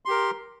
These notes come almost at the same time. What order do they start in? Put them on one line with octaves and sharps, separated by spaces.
C6 G4 A#4